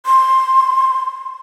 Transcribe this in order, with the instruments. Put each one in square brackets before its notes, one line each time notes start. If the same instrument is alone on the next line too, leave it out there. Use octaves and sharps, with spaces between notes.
[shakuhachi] C6